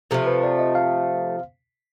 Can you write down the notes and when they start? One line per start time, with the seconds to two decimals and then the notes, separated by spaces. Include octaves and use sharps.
0.11 C3 F3 A3 A4
0.26 B4
0.43 D5
0.59 D#5
0.75 F5